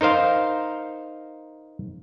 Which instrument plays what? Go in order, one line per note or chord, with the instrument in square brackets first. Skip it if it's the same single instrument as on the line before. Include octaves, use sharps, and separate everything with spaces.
[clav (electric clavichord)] D#4 A#4 C5 F5